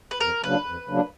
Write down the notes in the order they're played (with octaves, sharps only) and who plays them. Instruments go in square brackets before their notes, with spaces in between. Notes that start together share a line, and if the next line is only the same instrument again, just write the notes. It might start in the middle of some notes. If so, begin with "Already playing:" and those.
[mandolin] B4
[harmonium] F2 [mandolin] A#4
[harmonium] C#3 F#3 A#3 D4 [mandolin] B4
[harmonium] F2
C#3 F#3 A#3 D4